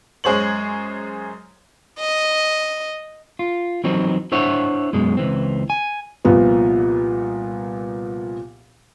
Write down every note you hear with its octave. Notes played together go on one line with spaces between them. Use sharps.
F#2 G#3 G#4 C5 C#5 F#7
D#5
F4
E3 F#3 C4 D#4
D4 E4 C5 C#5 E5 F#5
F#2 B2 G#3
C#2 E3 C4
G#5
C2 A#2 F3 B3